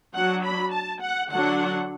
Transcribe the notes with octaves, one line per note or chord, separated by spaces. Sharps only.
F#3 D4 F#5
B5
A5
F#5
D3 F#3 D4 F#5